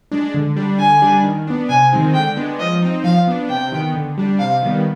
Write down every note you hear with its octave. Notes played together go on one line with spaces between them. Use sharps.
G#3 D4
D3
G3 D4
D3 G#5
G3 D4
D#3
B3 D4
C3 G#5
D#3 G#3 C4 D#4
D3 G5
G#3 B3 D4
F3 D#5
C4 D#4
F3 F5
B3 D4
C3 G5
D#3 B3
D3
G3 D4
C3 F5
D#3 G3 B3